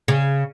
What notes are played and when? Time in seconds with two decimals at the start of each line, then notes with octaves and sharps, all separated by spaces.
0.08 C#3